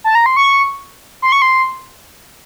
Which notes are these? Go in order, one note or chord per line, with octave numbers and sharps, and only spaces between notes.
A5
A#5
C6
C#6
C6
C#6
C6